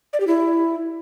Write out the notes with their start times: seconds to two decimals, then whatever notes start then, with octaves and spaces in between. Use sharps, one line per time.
0.13 D5
0.20 G4
0.27 E4